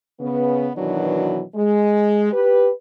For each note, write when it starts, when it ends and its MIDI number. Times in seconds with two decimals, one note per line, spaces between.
0.20 0.71 49
0.20 0.71 59
0.76 1.42 47
0.76 1.42 51
0.76 1.42 52
0.76 1.42 54
0.76 1.42 62
1.56 2.31 56
2.33 2.71 67
2.33 2.71 71